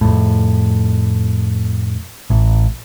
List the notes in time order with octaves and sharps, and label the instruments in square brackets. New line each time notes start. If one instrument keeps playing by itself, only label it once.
[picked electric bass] F2 A2
A1